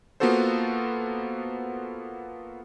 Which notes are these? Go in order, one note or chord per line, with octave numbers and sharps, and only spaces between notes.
A#3 B3 F4 F#4 A4 C5